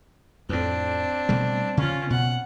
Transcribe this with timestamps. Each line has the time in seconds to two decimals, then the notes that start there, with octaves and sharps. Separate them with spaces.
0.49 F2 A2 C4 D4
1.29 B2 G3 A3
1.77 C#3 C#4 F4
2.10 B2 F#5